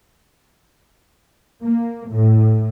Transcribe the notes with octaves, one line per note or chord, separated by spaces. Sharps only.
A#3
A2